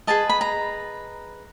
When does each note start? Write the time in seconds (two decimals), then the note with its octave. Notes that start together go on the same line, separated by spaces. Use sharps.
0.07 G#4 B4 D#5 A5
0.29 B5
0.41 A#5